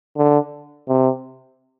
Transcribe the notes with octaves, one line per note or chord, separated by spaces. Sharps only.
D3
C3